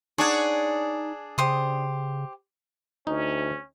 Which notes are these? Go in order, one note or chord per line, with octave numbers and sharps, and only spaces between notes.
D4 D#4 G#4 C#5 F#5
C#3 G4 C5 D#6
D2 C#4 D#4